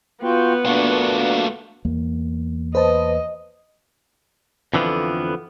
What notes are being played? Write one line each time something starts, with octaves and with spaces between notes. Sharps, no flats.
B3 F4 F#4 G5
A3 A#3 D4 F4 F#4
E2 A#3
B4 C5 D#5 A5
F2 D3 E3 F3 B3